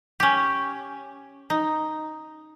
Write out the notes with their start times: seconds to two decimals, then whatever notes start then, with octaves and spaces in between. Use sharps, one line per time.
0.20 C#4 G4
1.50 D#4